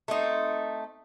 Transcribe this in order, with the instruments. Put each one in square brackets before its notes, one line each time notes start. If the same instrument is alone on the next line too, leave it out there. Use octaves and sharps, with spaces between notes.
[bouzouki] A3 C4 D#4